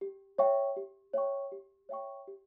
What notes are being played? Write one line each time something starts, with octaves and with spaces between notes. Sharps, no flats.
G4
C#5 E5 G5 C#6
G4
C#5 E5 G5 C#6
G4
C#5 E5 G5 C#6
G4